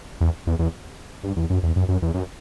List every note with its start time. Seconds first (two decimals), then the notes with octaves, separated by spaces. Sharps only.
0.21 E2
0.47 E2
0.59 E2
1.23 G2
1.36 E2
1.50 F#2
1.63 E2
1.76 F#2
1.88 F#2
2.02 E2
2.14 F#2